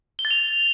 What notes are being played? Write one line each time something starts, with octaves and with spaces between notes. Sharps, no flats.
G7
A6
F7